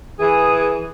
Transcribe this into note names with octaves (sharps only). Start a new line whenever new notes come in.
E3 G#4